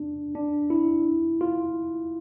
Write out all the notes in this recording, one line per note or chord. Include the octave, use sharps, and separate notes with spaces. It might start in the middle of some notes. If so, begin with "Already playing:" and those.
Already playing: D4
D4
E4
F4